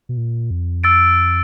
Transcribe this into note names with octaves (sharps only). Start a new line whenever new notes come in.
B2
A#2
F2
E6 A6 D7